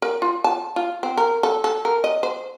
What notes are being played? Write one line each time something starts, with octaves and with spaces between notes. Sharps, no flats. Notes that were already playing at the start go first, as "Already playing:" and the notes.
A#4
F4
A5
F4
C4
A#4
A4
A4
A#4
D#5
C5